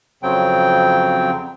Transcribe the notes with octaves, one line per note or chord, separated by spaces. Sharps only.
F2 C#3 F#3 C4 G5